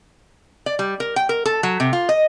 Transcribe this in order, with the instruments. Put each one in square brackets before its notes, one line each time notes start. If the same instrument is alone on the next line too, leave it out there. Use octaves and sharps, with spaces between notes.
[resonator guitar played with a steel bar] D5
G3
A#4
G5
A#4
A4
F#3
C3
F4
D#5